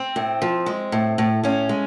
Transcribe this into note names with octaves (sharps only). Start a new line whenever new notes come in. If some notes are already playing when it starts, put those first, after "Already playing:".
Already playing: C4
A2
F3
G#3
A2
A2
A2 C#4
G#3